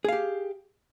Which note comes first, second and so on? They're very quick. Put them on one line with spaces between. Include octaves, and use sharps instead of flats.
G#4 F5 G4